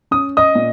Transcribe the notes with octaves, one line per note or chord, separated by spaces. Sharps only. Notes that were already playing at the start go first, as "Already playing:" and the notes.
C#4 D#6
D#5 D#6
A#2